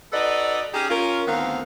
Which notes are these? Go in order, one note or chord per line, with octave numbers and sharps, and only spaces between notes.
D#4 F#4 A4 B4 D5 D#5
C#4 D#4 G4 G#4
C#4 F4 A#4
D2 D#3 B3 C4 A#4 F5